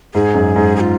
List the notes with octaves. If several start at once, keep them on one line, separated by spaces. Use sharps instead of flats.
G#2 G#4
F#2
G#2
G#4
F4